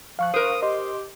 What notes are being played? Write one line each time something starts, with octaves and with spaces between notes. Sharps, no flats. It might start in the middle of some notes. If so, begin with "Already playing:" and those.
F3 F5 C#6 F#6
A#4 C5 D#6
G4 D#5 C6